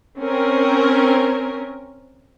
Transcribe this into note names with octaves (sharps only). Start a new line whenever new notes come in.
C4 C#4 A#4